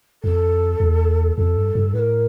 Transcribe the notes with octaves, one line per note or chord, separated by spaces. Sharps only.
F2 A4
E2
F2 A4
G2
G2
A2 B4
A#4